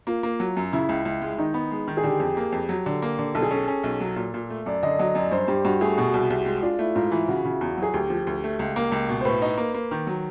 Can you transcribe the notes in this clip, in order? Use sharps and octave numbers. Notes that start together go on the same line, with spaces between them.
A#3 F4
A#3
F#3
F#2
C#3 E4
C#2
C#2
G#3
D#3 D#4
B3
G#3
D#3
G#4
D3 G4
F2
A#3
F2
F#3
D3
A#3
D3
B1 A4
G#4
C#4 A4
C#4
B1
F#3
A#2
A#2
A3
F#2 D5
D3 D#5
F#3 D#5
F#2 D5
G2 C5
G2 G4
G2 F#4
A3 G#4
B2 F#4
C2
C2
G#3
D4 F4
A3 E4
G#2 F4
E3 F4
C#3 F#4
C#3
E2
F#3 G#4
D2 G4
F3
D2
A3
C#2
A#3
C#2
B2
C5
A2 B4
D#4
A#3
A#3
D#3
F#3